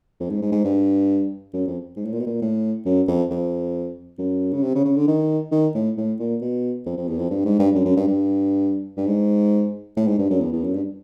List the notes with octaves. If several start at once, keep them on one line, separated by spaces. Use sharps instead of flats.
F2
G#2
G#2
G#2
G2
F#2
F2
G#2
A2
A#2
B2
A#2
A2
F#2
F2
F2
F#2
C#3
C3
C#3
C#3
D3
D#3
D#3
A2
A2
A#2
B2
F2
F2
E2
F2
G2
G#2
G2
F#2
F#2
G2
G2
G2
G#2
A2
G#2
G2
F#2
E2
E2
F#2
G2